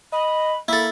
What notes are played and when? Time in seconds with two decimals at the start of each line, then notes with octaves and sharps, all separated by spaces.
0.12 D#5 B5
0.68 A#3 E4 A4 B5